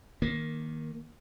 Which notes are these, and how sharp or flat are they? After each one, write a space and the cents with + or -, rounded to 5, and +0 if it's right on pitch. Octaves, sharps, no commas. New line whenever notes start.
D#3 +0 A#3 +10